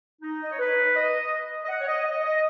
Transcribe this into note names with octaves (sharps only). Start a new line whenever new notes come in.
D#4
D#5
C#5
B4
D#5
D#5
F#5
C#5
D#5
D#5
D#5